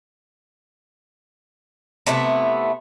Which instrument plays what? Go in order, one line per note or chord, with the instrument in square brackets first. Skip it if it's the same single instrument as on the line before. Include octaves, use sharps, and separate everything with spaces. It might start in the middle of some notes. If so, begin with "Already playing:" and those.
[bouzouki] C3 A3 B3 E4